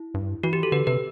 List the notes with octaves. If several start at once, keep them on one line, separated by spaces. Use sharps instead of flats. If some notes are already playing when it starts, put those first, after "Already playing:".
Already playing: E4
G2
E3 F#4
G4
A4
D3 B4
C3 B4